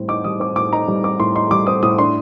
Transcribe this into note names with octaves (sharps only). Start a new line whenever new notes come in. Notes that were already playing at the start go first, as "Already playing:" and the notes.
Already playing: A2 G3 C4
D#4 D6
G3 D#6
C4 D6
A2 D6
D#4 A#5
G3
C4 D6
A2 C6
D#4 C6
G3 D6
C4 D#6
A2 D#6
D4 C6